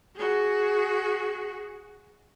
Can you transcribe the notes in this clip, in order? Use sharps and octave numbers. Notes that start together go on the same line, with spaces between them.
F#4 G#4